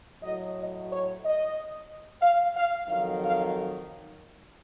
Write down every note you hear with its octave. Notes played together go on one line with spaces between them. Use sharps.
A2 F#3 D#5
D#5
C#5
D#5
F5
F5
F2 D#3 F#3 F5
F5